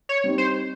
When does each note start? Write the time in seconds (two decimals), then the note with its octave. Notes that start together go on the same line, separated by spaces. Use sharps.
0.09 C#5
0.24 G3 C4 D#4
0.38 C5